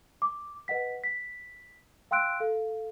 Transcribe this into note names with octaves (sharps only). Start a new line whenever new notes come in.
D6
B4 D#5 F#5 B6
B6
F5 G5 C6 E6 F#6 D7
A4 F5